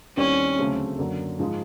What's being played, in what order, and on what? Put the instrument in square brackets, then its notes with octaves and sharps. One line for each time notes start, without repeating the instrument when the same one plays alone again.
[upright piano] D#2 D#3 G3 C4 E4 [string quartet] C#4
[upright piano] D2 C#3 F#3 A3 C4
F#2 D3 F#3 A#3
G#2 F3 G#3